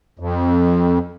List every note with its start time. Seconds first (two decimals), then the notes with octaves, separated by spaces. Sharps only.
0.19 F2